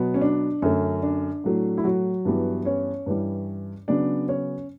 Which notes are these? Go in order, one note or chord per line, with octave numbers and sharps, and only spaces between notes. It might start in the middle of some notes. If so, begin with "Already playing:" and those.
Already playing: B2 F#3 B3
C#4
D4
F#2 D3 A3 C#4
D4
A2 F#3 A3
E4
F#3 F#4
G2 E3 G3 B3
C#4 C#5
G2 E3 G3
C#3 F#3 B3 D4 D5
C#4 C#5